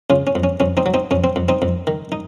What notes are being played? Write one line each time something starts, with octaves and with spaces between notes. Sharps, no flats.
C#3 C#4 F4
C#4
F2
C#4
F2 C#4
C4 D#4
F#3
C4 D#4
F2 C#4
C4
F2
C4 D#4
F2
D#3
D#4